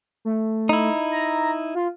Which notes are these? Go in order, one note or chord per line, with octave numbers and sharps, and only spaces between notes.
A3
D#4 E4
A#5
F4